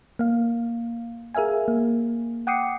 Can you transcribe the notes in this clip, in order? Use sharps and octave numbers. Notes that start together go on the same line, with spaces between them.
A#3 F5
G#4 A#4 E5 F5 G#5
A#3
F#5 G5 D6 D#6 C7 C#7